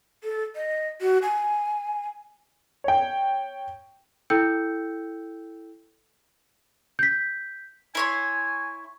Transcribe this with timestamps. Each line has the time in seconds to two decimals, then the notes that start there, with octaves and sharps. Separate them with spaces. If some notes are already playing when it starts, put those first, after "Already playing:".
0.24 A4
0.56 D#5
1.01 F#4
1.22 G#5
2.84 C#5 G5
4.30 E4 A4 G5 E6 G6 C#7
6.99 G6 B6
7.95 E4 C#5 G#5 C6